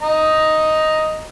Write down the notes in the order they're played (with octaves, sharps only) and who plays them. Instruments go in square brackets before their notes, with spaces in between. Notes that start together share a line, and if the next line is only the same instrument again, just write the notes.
[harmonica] D#5 A#5